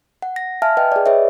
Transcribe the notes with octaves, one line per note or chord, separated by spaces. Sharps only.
F#5
A#6
E5 F5 G#5 A5 F6
B4 D#5 G5
G#4 D5
G#4 B4 C#5 D#5 E5